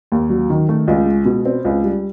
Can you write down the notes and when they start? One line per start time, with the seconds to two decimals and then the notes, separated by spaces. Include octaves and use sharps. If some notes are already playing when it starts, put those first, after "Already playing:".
0.12 D#2
0.30 F#3
0.50 D#3
0.69 A3
0.88 C#2
1.06 G#3
1.25 B2
1.46 C4
1.65 C#2
1.84 G3